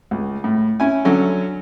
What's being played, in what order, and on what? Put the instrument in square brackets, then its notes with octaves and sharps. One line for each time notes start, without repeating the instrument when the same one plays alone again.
[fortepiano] C#2
A2
C#4 E4 G#5
D3 F#3 C#4 A4